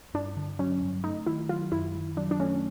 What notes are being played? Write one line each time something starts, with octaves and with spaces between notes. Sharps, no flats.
G2 D4
D3
F#3 C#4
G2
A3 D#4
D#3 E4
F#3 F4
F#2 E4
D#3
F#3 D4
D4
A3 C#4